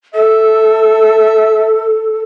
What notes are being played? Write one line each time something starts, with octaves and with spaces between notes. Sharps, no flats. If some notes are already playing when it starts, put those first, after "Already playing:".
A4 E5